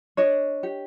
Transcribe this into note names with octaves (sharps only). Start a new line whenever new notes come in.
D4 C#5 D#5
G4